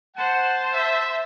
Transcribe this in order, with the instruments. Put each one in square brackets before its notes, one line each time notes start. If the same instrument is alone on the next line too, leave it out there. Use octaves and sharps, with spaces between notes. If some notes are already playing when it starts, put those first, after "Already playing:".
[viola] C5 A5 [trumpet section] F#5
[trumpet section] E5